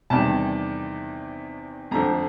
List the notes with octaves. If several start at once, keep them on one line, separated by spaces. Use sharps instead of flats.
E2 C3 D#3 G3 A5
F2 D3 F3 A#5